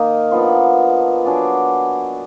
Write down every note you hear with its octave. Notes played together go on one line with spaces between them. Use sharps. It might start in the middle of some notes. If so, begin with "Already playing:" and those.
Already playing: D#3 A#3 D#4
F3 B3 D4
F#3 D4 G#4 D5